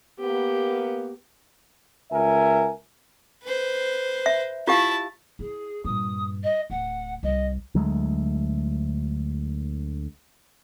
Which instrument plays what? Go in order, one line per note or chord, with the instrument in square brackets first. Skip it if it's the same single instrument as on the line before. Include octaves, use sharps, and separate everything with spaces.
[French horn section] A#3 B3 [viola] G4
[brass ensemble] C#2 A#4 E5 G#5
[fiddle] B4 C5
[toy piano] E5
[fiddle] E4 A5 [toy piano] F4 G4 F5
[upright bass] E4 [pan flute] G#4
[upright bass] G2 A#2 [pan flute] D#6
[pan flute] D#5
[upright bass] D1 [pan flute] F#5
[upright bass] C2 [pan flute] D#5
[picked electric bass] D2 F#3 G#3 A3